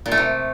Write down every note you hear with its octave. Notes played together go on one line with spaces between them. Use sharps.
A#2
A3
C3